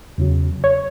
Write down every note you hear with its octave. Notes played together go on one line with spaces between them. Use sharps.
E2 C#3 F#3
C#5